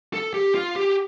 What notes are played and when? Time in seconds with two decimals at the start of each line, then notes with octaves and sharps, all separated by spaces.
0.14 A4
0.34 G4
0.55 F4
0.76 G4